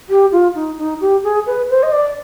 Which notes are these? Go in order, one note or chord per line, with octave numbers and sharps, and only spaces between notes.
G4
F4
D#4
D#4
G4
G#4
B4
C5
D#5
D5